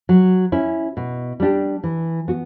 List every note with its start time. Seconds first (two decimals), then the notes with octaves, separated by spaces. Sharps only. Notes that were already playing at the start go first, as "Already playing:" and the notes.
0.09 F#3
0.52 C#4 E4
0.97 B2
1.40 G3 D4 G4
1.84 E3
2.28 B3 F#4